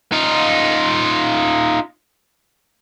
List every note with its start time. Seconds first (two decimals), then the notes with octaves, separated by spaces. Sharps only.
0.12 D#4 F4